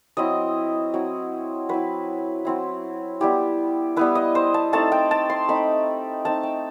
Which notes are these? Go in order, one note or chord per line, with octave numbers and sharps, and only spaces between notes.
F#3 C4 E4 D#5
F#3 C4 E4
F#3 C4 E4 B4
F#3 C4 E4
G3 B3 E4 G4
G3 B3 E4 B4
D#5
C5
A5
A3 C4 D#4 A5
G5
A5
C6
A3 C4 D#4 B5
A3 C4 D#4 A5
G5